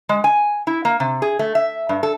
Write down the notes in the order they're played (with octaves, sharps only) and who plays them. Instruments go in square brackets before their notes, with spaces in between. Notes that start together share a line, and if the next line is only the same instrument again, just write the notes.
[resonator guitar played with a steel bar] G#3
G#5
E4
A#3
C3
G#4
A3
E5
G2
A4